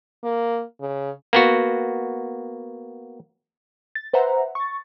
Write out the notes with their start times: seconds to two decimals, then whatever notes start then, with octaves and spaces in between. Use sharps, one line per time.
0.24 A#3
0.81 C#3
1.33 A#3 B3 F#4
3.95 A6
4.13 B4 C5 E5 F#5 A#5
4.55 C#6 A6